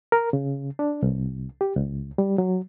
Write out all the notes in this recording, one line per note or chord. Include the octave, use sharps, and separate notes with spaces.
A#4
C#3
D4
C2
G4
C#2
G3
F#3